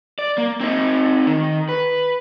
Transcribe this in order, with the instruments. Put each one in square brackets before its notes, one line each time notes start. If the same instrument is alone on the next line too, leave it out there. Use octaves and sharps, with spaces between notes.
[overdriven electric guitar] D5
A#3
C4 D#4
D#3
B4